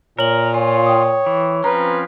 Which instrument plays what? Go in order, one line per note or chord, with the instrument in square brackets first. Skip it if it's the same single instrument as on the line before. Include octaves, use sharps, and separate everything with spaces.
[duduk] A#2 [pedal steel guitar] A#4 [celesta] C#5 F#7
[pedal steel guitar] F4 [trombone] C#5 [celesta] G#5
[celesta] G5 D#6
[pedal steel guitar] E3
[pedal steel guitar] F3 C4 C#4 [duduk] B4 [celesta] A#5